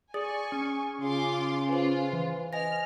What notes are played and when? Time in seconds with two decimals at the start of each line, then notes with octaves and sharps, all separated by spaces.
0.14 G#4 D5 G#5 C#6 D#6
0.52 C#4
1.01 C#3 F4 C6 D6
1.69 F4 B4 C5
2.13 E3
2.53 D#5 G#5 F6 A#6